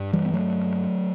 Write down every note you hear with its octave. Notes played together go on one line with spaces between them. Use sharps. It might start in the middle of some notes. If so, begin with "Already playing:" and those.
Already playing: G2
E3 G3
B3
F#3 A3